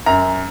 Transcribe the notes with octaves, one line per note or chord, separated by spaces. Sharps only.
F#2 A#5